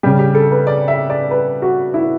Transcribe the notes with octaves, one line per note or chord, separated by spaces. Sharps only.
C#3 G3 G4
G4
A4
B4
D5
E5
D5
B4
F#4
E4